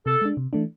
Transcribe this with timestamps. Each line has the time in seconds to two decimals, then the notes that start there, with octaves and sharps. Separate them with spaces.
0.06 C3 A4
0.22 G#3 D4
0.37 C3
0.53 E3 A3 D4